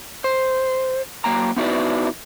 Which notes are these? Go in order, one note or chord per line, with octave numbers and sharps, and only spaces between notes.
C5
F#3 A#3 G5 A#5
B3 D#4 E4 F#4 B4 D5